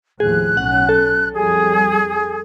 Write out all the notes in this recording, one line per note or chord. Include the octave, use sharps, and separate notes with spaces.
D#2 A2 F3 G#4 F#6
B1 C#4 F#5
A4
F2 G3 G#4